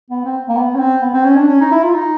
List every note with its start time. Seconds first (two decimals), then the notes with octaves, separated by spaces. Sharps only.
0.10 B3
0.25 C4
0.49 A#3
0.57 B3
0.74 C#4
0.79 C4
1.02 B3
1.14 C4
1.25 C#4
1.36 D4
1.48 C#4
1.61 D#4
1.72 E4
1.83 F4
1.95 D#4